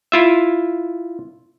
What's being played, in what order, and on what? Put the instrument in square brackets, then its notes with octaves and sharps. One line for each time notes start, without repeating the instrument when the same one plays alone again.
[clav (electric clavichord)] E4 F4 E5